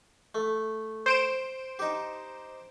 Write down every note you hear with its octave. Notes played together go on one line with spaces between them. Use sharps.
A3
C5 D7 E7
D#4 G4